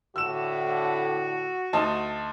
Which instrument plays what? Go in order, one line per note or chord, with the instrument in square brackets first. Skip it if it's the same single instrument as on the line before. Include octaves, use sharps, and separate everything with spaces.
[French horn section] A2 D3 [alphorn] F#4 [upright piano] E6 E7
[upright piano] D2 D#4 A5